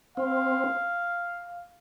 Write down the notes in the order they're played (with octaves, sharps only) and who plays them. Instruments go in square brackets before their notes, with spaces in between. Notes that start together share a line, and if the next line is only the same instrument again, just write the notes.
[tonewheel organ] C4 [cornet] F5